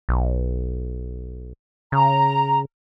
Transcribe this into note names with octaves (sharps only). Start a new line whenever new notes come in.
B1
C#3 A#5